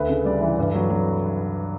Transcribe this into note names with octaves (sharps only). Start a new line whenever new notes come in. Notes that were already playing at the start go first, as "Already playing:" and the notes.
Already playing: D2 B4
C#3
G3 D5
E3
G2
F#3
F#3